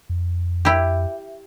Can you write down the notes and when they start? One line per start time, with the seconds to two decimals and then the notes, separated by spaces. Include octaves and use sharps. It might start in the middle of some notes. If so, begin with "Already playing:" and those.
0.10 F2
0.65 E4 G4